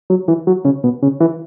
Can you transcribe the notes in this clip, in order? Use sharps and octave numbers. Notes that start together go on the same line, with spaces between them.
F#3
E3
F#3
C#3
B2
C#3
E3